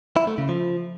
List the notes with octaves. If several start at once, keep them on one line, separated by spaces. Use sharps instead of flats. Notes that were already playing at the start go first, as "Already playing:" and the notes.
E4
A3
C#3
F3